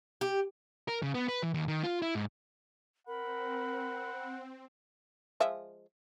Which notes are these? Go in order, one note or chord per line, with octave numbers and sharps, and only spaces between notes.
G4
A#4
C#3
B3
B4
E3
D#2
D#3
F4
E4
G#2
C4 A#4 F#5 B5
F3 G#3 E5